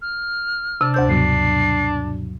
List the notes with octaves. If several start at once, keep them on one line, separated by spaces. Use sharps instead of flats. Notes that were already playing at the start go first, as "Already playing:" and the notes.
F6
C3 D4
D2 C5 E6 G6
G2 B2 F#3 C7